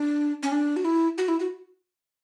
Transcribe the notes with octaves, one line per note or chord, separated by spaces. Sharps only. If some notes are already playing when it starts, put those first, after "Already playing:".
Already playing: D4
C#4
D4
F#4
E4
F#4
E4
F#4